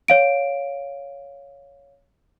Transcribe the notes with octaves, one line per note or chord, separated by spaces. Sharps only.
C#5 F5 D7